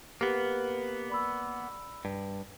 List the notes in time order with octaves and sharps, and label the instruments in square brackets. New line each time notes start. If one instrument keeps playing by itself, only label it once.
[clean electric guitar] A#3 B3 [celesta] G4 B4
[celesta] D5 B5 E6
[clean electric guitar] G2